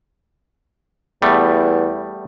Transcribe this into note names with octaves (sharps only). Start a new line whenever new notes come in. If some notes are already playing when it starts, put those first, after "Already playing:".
E2 G3 A3 B3